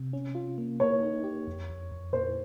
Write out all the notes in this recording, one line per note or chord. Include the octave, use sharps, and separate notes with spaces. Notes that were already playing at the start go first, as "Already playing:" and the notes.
Already playing: C3
C#4
F4
A#3
A#3 C#5
D#4
G4
F2
F2
F2
A#2 C5